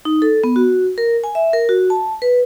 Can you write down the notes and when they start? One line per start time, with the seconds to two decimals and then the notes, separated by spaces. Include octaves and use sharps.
0.05 D#4
0.22 A4
0.44 B3
0.56 F#4
0.98 A#4
1.24 G#5
1.35 E5
1.53 A#4
1.69 F#4
1.90 A5
2.22 B4